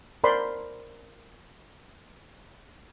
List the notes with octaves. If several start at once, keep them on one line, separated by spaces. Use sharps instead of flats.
A#4 C5 D5 B5 C6